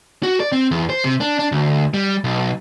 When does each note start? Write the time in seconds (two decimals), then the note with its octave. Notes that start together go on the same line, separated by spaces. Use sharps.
0.23 F#4
0.40 D5
0.52 C4
0.71 E2
0.90 C5
1.05 C3
1.21 D4
1.39 D4
1.52 D2
1.94 G3
2.24 B1